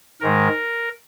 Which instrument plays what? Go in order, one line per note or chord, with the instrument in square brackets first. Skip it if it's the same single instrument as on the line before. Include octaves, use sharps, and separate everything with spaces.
[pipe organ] G#2 D#3 G#3 A#4